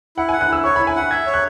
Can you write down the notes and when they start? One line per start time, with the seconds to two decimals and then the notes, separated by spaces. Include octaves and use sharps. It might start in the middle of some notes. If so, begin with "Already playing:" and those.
0.17 E4 F#5
0.29 G#5
0.33 F#5
0.41 F#6
0.48 E4 E6
0.64 C#5 C#6
0.76 B5
0.80 E4
0.87 G#5
0.96 F#5 B5
1.11 E5 G#6
1.26 C#5
1.34 F#6